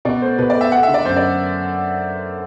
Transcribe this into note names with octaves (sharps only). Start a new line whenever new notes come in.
B2 D5
A3 C5
B2 B4
D5
A3
E5
A3 F#5
E5
D3
D5
F#2 C5
D5